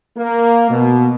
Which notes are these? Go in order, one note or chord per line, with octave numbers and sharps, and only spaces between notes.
A#3
B2